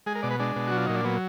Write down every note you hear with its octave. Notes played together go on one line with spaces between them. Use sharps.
G#3 G#4
A#4
B2 D5
B4
G#3 D4
B2
F#3 F#4
F4
A#2 D#4
D4
F#3 B3